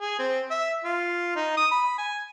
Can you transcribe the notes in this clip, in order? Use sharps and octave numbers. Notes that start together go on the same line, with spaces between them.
G#4
C4
E5
F4
D#4
D#6
B5
G#5